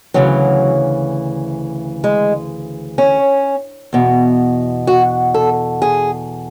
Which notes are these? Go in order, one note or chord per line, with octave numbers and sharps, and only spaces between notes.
D2 C#3 E3 F#3
G#3
C#4
E2 B2
F#4
A4
G#4